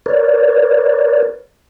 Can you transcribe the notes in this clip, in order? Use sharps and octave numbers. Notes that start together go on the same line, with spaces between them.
A#4 B4 C#5 D5